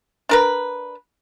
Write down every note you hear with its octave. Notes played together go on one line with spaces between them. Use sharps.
D4 A#4 B4